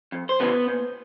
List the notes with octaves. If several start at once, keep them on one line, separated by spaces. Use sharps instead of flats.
F2
C5
C#3 E3 B3 B4
A#2